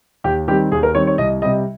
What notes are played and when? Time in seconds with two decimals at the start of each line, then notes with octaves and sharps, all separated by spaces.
0.24 D#2 G4
0.48 D#3 G3 C4 G4
0.72 D#2 G#4
0.83 A#4
0.95 D#3 G3 C4 C#5
1.07 C#5
1.18 C2 D#5
1.42 G3 D#5
1.45 C3